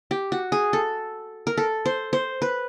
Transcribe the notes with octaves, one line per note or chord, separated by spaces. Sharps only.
G4
F#4
G#4
A4
A#4
A4
C5
C5
B4